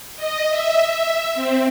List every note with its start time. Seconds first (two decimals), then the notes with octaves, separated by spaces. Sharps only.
0.16 D#5
0.49 E5
0.86 E5
1.34 C4